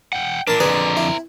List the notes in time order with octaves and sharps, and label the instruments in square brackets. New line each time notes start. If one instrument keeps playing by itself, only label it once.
[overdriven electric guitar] F#5 G5
[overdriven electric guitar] A#2 D4 [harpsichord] A#4 A5
[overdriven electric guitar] F2 D3 [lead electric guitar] C4 A#4 [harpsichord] D4 G#4 B4
[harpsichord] E4